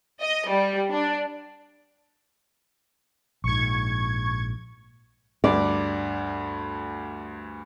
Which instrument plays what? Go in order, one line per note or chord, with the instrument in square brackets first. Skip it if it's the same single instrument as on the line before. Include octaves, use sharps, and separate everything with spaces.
[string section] D#5
G3
D4
[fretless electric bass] A#1 G#2 [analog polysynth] C#6 G#6
[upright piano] D2 G2 [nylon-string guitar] D5